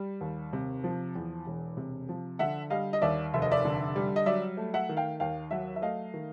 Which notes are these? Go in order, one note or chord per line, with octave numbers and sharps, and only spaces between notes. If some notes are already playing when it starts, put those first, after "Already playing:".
Already playing: G3
D#2
C3
F3
E2
E1
C3
F3
D3 E5 F#5
G3 D#5 F5
D#5
D#2 D5 E5
F1 E5
D#5
D5 E5
D3
G3
D#5
F#3 D5 E5
A3
E5 F#5
D#3
F5 G5
D#2 F5 G5
F#3 E5 F#5
E5
A3 D#5 F5
D#3